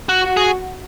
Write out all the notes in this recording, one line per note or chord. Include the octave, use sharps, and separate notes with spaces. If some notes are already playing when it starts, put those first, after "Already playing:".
F#4
F#4
G#4